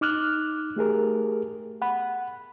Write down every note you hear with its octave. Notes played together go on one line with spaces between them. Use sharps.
D#4 D6 F6 F#6
A3 G4 G#4 A#4
F#5 B5